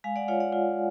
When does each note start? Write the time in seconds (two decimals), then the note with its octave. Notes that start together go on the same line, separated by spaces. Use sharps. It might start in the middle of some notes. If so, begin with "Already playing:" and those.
0.04 G#3 F5 G#5
0.16 D5 F#5
0.28 F4 C#5 F5
0.40 D5 F#5
0.52 F4